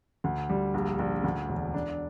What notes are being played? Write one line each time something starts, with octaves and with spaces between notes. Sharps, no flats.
D2
G3
A#1
A#1
D2
E1
D4